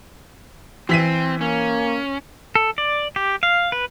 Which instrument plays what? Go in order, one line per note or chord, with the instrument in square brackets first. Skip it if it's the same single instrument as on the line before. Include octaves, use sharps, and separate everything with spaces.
[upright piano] E3 B6 D#7 [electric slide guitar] C4
[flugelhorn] A#3 [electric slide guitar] C#4
[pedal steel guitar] A4
D5
G4
F5
B4